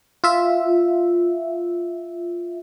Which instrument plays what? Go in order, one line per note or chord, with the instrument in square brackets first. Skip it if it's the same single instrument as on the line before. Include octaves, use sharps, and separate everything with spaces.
[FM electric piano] F4 E5